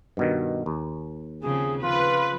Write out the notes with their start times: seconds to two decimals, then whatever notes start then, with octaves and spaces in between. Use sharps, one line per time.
0.17 G2 B2 D#3
0.66 D#2
1.43 C#3 F3 C4 G#4
1.83 C#3 F3 F4 B4